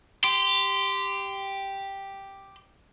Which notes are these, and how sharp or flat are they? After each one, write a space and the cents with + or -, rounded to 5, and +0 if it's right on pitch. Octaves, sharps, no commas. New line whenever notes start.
G4 +0 C6 -25